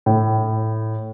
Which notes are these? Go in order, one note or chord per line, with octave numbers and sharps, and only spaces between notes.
A2